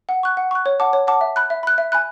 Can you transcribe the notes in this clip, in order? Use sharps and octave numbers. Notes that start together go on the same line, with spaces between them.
F#5
C#6 F#6
F#5
C#6 F#6
C#5
F#5 A5 D6
C#5
F#5 A5 D6
E5
B5 F#6
E5
B5 F#6
E5
G#5 B5 F#6